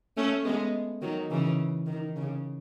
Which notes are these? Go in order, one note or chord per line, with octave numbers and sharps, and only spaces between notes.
A3 C#4
G#3 B3
D#3 F#3
C#3 E3
D#3
C#3